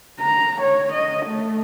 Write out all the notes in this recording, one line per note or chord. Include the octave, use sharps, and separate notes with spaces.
A#5
C#5
D#5
A3